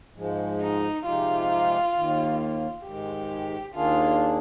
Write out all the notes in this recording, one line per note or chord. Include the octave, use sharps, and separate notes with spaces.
G#2 F3 G#3
D#4
C3 F3 G#3 D#4 F4 G4
D#2 D#3 A#3
G#2 D#3 G#3 G4
D#2 D#3 A#3 D4 F4 G#4